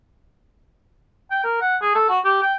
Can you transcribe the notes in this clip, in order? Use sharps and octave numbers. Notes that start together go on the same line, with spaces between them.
G5
A#4
F#5
G#4
A4
F#4
G4
G5